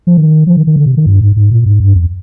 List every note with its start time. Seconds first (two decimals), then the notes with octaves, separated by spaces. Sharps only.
0.07 F3
0.17 D#3
0.47 F3
0.57 D#3
0.67 D#3
0.76 D3
0.86 C3
0.97 D#3
1.06 G2
1.21 G#2
1.36 G#2
1.51 A#2
1.66 G#2
1.80 G2
1.95 F2